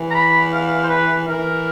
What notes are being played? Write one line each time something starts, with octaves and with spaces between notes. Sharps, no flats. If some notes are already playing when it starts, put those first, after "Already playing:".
Already playing: E3
A#5
B5
F5
C5
B4
E3 A#4